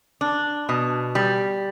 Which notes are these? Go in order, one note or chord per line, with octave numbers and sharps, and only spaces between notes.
D4
B2
G3